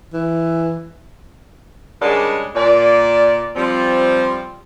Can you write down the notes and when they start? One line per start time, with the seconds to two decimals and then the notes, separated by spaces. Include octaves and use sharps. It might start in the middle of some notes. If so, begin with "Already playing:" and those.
0.14 E3
2.01 C#3 G3 G#3 D4 G#4 A#4
2.55 A#2 D5
3.56 F3 G3 C4